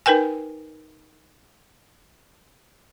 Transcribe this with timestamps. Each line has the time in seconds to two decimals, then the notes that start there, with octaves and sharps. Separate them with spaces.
0.06 D#4 A#4 B4 G5 G#5